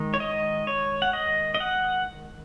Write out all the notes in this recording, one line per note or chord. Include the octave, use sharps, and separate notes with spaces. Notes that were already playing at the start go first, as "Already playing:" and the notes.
Already playing: D#3 G#3 D#4
C#5
D#5
C#5
F#5
D#5
D#5
F#5